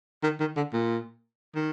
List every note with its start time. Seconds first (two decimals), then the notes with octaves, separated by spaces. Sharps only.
0.24 D#3
0.40 D#3
0.56 D3
0.73 A#2
1.55 D#3